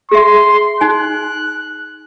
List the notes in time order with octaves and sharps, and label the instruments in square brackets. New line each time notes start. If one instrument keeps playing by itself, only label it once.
[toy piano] G#4 E5 [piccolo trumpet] C6
[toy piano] D#4 G#5 [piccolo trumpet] F#6